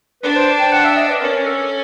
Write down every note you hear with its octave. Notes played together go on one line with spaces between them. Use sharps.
D4 B4
C5
G5
F#5
E5
D#5
B4
C#4 A#4
A4